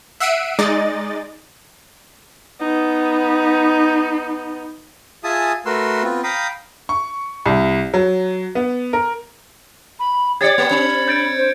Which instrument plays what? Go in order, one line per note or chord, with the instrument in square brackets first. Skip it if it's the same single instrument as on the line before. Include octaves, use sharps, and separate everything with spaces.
[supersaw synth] E5 F#5 E6 C7 D7 D#7
G#3 D#4 D5 D#5 A6
[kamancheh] B3 D#4
[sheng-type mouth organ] F4 G#4 E5 G#5 A5 D#6
A3 F#4 A#4 B4 C6 E6
B3 C4 F4
F5 G5 A#5 B5 D#6
[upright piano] C#6
C2
F#3
B3
A#4
[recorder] B5
[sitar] G4 D5 [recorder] C#5 [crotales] G#6 A6 C#7
[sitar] A#3 G4
[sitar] C4 [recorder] B5
[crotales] G6 A6 D7
[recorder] C5